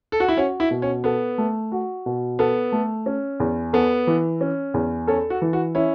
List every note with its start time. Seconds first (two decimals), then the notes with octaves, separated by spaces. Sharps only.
0.12 A4
0.20 F#4
0.28 E4
0.37 C#4 F#4
0.60 E4
0.71 B2
0.82 C#4
1.04 B3 A4
1.38 A3
1.72 F#4
2.06 B2
2.39 B3 A4
2.72 A3
3.06 C#4
3.40 E2
3.73 B3 A4
4.07 E3
4.41 C#4
4.74 E2
5.07 C#4 A4
5.30 F#4
5.41 E3
5.53 F#4
5.75 C#4 E4